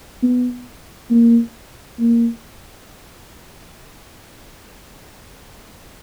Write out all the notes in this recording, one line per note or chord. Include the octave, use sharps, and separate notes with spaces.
B3
A#3
A#3